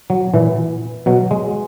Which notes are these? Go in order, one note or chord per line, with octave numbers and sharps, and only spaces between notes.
F#3
A#2 E3
B2 F#3
G#3